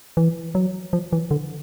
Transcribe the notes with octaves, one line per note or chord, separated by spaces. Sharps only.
E3
F#3
F3
E3
D3